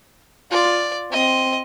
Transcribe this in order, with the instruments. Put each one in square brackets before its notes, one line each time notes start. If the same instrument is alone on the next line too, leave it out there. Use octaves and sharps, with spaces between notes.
[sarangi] F4 [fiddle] D5
[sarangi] C4 [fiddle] D#5